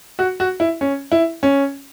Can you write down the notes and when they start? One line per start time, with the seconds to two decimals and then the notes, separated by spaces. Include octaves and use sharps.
0.19 F#4
0.40 F#4
0.60 E4
0.81 C#4
1.12 E4
1.43 C#4